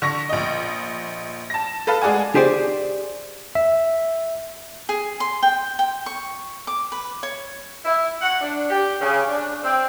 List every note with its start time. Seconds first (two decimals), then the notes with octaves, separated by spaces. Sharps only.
0.02 D3 C#6 A#6
0.29 A#1 D#5
1.50 A5 A#6
1.87 A4 B4 F5 A5
2.02 G#3 G#4 D5 F#5 G#5
2.35 G4 G#4 C5 D5
3.55 E5
4.89 G#4
5.20 C6
5.43 G5
5.79 G5
6.06 C#6
6.67 D6
6.92 B4
7.23 C#5
7.85 E4
8.21 F#5
8.41 D4
8.70 G4
9.01 C#3
9.28 D4
9.64 C4